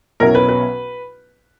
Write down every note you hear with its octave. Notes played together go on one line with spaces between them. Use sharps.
B1 B2 F#3 C#4 E4 A#4
B4
B4